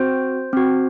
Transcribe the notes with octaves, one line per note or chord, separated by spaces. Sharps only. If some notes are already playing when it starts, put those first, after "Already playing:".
Already playing: C4 F#4 C5
C4 F#4